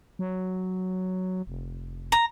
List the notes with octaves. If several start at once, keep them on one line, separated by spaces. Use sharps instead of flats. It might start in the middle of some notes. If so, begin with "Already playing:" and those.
F#3
F1
A#5